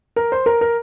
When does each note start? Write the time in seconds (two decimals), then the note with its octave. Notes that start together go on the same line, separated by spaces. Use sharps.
0.16 A#4
0.32 C5
0.46 A#4
0.61 A#4